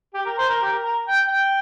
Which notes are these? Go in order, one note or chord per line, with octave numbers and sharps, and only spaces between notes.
G4
A#4
C5
A#4
G4
A#4
A#4
G5
G5